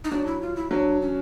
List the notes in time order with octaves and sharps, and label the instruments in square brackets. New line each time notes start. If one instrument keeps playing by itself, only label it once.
[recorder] D#4
[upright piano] F#3 [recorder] D4
[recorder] E4
F4
E4
[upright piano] F#3 [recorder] D4
[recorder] C#4